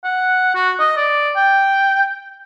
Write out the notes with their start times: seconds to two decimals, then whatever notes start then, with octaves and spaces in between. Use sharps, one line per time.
0.04 F#5
0.55 F#4
0.79 D#5
0.97 D5
1.36 G5